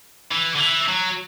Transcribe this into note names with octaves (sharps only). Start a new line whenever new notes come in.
E3
D3
E3
F#3